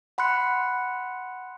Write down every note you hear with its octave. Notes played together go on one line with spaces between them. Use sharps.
F#5 B5 C6 F#6 C#7